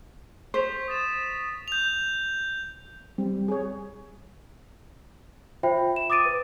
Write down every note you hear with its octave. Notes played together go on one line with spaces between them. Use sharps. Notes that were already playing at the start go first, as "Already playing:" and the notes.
C5 C#6 B6 F7
D#6 A6 E7
G6 F7
G3 C4
G#4 C#5
F4 C5 E5 G5 B5
E7
D6 D#6 A6 D7 D#7
B4